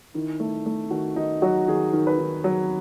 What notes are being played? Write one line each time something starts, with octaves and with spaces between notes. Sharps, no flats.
D#3 E4
A3
A3
D#3 F#4
D#3 D#4
F#3 F#4
D#3 G#4
D#3
B4
D#3
F#3